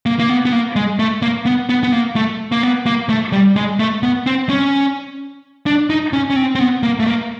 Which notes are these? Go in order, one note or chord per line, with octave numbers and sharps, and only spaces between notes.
A#3
A#3
B3
B3
A#3
G#3
A3
A#3
B3
B3
B3
A#3
A3
A#3
B3
A#3
A3
G3
G#3
A3
B3
C4
C#4
D4
D#4
C#4
C#4
C4
C4
B3
A#3
A3
A#3